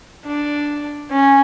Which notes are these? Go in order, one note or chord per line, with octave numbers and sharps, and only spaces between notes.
D4
C#4